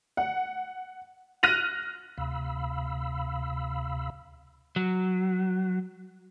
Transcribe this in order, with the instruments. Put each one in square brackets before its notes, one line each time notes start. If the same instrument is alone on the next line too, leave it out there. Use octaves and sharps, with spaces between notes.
[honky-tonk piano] F#5
F6 F#6 A#6 D#7 F7
[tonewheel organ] D2 C3 F5 B5 E6
[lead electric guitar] F#3